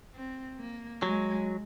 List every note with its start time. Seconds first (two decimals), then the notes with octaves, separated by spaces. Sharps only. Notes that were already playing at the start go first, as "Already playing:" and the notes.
0.14 C4
0.59 A#3
1.03 F#3 G#3